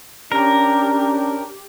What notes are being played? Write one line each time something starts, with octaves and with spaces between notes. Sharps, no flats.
C#4 D4 G4 A#4